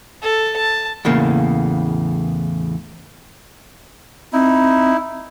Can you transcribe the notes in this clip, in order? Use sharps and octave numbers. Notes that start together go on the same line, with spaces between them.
A4
A5
E2 A2 C#3 A#3
C4 D#4 E4